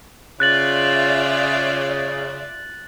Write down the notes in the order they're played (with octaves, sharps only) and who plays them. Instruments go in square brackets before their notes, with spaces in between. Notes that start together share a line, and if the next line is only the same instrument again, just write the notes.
[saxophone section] C#3 [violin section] F4 D5 E5 [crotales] F#6 A6 F#7